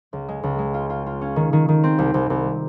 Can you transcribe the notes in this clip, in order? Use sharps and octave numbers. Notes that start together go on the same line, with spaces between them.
C#2
G#3
C#2
G#3
F4
F4
F4
C#4
D#3
D#3
D#3
C4
C2
C2
C2